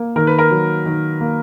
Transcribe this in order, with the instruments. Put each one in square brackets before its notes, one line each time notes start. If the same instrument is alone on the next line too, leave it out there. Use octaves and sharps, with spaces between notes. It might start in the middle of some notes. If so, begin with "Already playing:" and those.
Already playing: [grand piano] A#3
D#3 A#4
B4
A#4
F#3
D#3
A#3